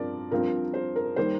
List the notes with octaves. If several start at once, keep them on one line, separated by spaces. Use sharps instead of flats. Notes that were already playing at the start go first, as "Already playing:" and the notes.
Already playing: G2 F3 C4 A#4 D5
G2 F3 C4 F4 A#4
C5
A#4
D#3 G3 A#3 C5